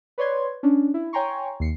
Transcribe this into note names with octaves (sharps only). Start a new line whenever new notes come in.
B4 C#5 D5 C6 G#6
C#4 D4
E4
C#5 G5 G#5 A#5 C6 C#6
D#2 C7 C#7